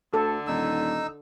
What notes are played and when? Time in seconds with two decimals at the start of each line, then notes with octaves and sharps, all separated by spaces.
0.14 D2 D3 A4
0.47 D#1 D#4 E6